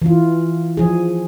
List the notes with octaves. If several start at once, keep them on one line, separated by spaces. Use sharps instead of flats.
E3 F4
F3 G#4